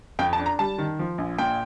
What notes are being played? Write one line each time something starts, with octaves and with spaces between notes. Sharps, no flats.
F2 G5
A5
D4
A#5
G3 A5
D#3
F3
A#1
A#2 G5